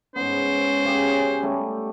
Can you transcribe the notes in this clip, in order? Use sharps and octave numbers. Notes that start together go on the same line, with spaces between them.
G#2 B3 C#4 C5
C#3 G4 G#4
G3 A3